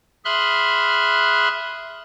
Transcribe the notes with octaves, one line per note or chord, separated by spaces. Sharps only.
G#4 E5 B5 C6 F6 F#6